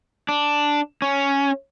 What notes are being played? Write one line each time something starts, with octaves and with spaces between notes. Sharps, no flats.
D4
C#4